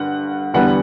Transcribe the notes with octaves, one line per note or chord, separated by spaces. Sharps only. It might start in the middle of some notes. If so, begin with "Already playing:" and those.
Already playing: G2 D3 F#5
E2 D3 G3 B3 F#5